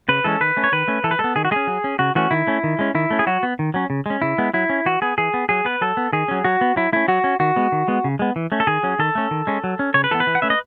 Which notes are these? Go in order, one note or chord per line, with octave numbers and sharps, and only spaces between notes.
C#3 B4
E3 G#3 C#4 A4
D#3 B4
A3 C#4
C#5
D#3 B4
A3 C#4
E3 A4
B4
G#3 A4
B3
D#3 G#4
F#4
G#3 C#4 G#4
F#3
C#4
C#3 F#4
E3 A3 C#4 F#4
D#3 E4
A3 C#4
D#3
G#3 C#4
D#3 E4
A3 C#4
G#4
F#3 F#4
B3
D#3
F#3 C#4
C#3
G#3 C#4
C#3 E4
G#3 B3
F#3 E4
C#4
E3 F#4
B3 G#4
E3 G#4
B3
F#3 G#4
B3 B4
F#3 A4
B3
D#3 G#4
F#3 C#4
F#3 F#4
B3
F#3 E4
A3 C#4 E4
F#3 F#4
C#4
D#3 F#4
G#3 B3
D#3
G#3 B3
C#3
G#3 B3
E3
A3 C#4
A4
D#3 G#4
F#3 C#4
D#3 A4
A3 C#4
D#3
G#3 C#4
F#3
C#4
C#3 C#5
B4
E3 B3 A4
B4
E3
F#5
A3 C#4 E5
D#5